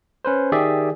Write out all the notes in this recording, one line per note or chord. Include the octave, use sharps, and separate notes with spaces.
C#4 B4 C5
D#3 G4 G#4 D5 E5